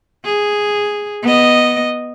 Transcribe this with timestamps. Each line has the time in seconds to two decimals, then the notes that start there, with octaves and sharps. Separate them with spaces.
0.25 G#4
1.23 B3 D#5